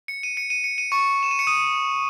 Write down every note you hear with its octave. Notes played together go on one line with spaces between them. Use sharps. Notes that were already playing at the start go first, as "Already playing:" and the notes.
C#7
D#7
C#7
D#7
C#7
D#7
C#6 C#7
E7
D#7
C#7
D#6 D#7